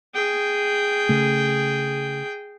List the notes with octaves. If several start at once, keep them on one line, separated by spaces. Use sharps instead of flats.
G#4 G5
C#3 A3